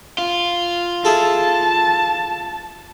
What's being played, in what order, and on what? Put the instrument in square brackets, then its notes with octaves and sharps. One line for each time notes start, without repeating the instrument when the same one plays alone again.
[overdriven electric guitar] F4
[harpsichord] E4 G#4 A4 [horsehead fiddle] A5